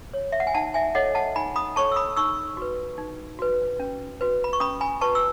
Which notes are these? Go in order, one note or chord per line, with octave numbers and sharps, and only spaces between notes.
C#5
E5
F#5
G#5
D#4 F#5 A5
E5 G#5
A4 C#5 D#5 F#5
F#5 A5
D#4 G#5 B5
B5 D#6
A4 C#5 A5 C#6
E6
B5 D#6
D#4 C#6 E6
F#4 B4
D#4
F#4 B4
C#4
F#4 B4
B5
C#6
C#4 B5 D#6
G#5 B5
F#4 B4 A5 C#6
E6